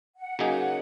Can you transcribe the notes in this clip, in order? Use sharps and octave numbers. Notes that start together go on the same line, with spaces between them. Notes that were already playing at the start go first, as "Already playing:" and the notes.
F#5
C#3 F#3 A#3 D#4 G#4